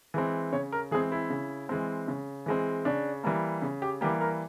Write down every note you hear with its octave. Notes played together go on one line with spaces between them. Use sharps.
E3 G#3 C4
C#3 C#5
A#4
E3 G#3 C4 G#4
E4
C#3
E3 G#3 C4
C#3
E3 G#3 C4
C#3 D4
E3 G3 A#3
C#3
G4
E3 G3 A#3 G4
A#4